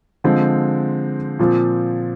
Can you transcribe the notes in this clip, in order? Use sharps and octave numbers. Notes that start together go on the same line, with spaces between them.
D3 F3 G#3 C4
A#2 F3 C4